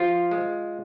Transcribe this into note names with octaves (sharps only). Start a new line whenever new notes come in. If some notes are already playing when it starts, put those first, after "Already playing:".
Already playing: F3 F4
G#3